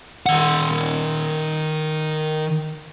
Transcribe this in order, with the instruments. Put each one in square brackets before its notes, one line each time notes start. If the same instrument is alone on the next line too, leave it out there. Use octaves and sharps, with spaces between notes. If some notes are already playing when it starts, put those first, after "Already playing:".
[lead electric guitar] D#3 F#5